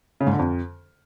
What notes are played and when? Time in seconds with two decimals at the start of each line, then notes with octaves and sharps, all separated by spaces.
0.21 C#3
0.27 G#2
0.33 D3
0.39 F2